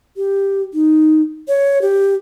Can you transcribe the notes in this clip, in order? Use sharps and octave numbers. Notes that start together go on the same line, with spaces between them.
G4
D#4
C#5
G4